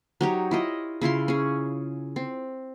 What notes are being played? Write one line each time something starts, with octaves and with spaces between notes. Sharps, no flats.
F#3 D#4 G4 C#5
E4 F4 D#5
C#3 E4 F4 C6
C#4 G#4
C4